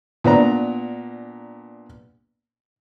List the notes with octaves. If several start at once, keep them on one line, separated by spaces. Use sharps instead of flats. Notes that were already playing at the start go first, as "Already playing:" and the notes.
A#2 B3 D4 A#5